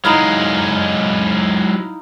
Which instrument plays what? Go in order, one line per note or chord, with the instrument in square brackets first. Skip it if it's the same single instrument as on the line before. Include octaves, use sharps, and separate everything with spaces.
[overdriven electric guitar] F#3 G#3 [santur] D#4 E4 F5